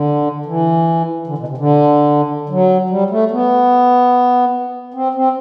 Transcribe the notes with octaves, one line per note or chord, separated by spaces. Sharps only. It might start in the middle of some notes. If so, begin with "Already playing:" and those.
Already playing: D3
E3
D3
B2
C3
D3
F#3
G3
A3
B3
C4
C4